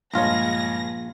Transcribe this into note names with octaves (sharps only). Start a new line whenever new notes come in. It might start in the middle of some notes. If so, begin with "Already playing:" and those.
A#1 G2 G#3 F4 G#4 C#5 A#6